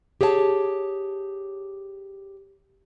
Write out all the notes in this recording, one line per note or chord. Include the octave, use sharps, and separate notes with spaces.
G4 G#4 C#5 E5 A5